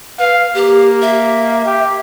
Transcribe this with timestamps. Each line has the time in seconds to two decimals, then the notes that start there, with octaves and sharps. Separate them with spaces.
0.19 B4 F5
0.54 A#3 G4
1.02 E5
1.66 G4